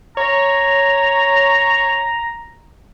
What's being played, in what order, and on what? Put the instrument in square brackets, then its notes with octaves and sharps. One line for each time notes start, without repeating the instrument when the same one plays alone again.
[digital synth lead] C#5 [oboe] A#5